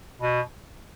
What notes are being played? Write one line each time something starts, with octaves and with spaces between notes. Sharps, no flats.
B2